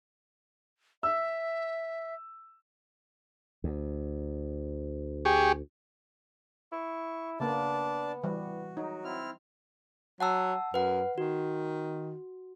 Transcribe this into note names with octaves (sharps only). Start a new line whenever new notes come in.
E5 E6
D2
G4 G#4 C#6
E4 C#6
C#3 A#3 B3 D4 D5 A5
E3 G3 F#4
F#3 D#4
C4 E4 F6
F#3 F#5 A5 E6
F#2 B4 F#5
D#3 F#4